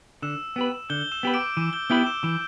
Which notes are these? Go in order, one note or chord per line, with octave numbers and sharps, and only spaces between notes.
D3 E6 E7
B3 G4 B4
D3 G6 G7
G7
E6 E7
B3 G4 B4
D6 D7
E3 E6 E7
G6 G7
B3 E4 G4 B4 G6 G7
E6 E7
E3 D6 D7